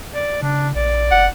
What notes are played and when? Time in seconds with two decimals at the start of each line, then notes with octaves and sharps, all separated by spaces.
0.14 D5
0.42 C#3 D4
0.75 A#1 D5
1.11 F#1 F#5